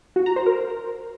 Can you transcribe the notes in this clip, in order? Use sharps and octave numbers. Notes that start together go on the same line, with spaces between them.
F#4
A#5
C5
A#4